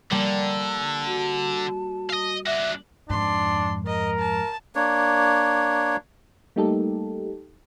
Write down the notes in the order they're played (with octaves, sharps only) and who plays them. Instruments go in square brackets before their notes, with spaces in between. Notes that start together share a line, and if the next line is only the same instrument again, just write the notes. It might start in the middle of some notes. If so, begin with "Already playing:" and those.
[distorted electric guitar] D3 [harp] G3 A#3 [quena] A5
[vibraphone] F#4
[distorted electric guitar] D#5 F5
[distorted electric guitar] D4 F#4 [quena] E5
[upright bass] F2 G#2 [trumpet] D4 [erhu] C6
[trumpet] A#4 [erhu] D#5
[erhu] A5
[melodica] A#3 D4 C#5
[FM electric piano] G3 A3 A#3 D#4 G4 A4